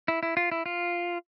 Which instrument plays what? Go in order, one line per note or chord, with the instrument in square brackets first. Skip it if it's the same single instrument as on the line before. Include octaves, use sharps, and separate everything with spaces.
[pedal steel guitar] E4
E4
F4
E4
F4